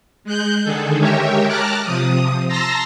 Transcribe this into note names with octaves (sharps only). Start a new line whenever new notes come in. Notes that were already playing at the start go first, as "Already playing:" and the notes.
G#3 F#6 G6
D3 D#3 G#4 A4
G#3 G4 A#4 C#5 E5 G5
A5 A#5 D6 F6 F#6
C3 F3 D#6
A5 A#5 C6 E6 A#6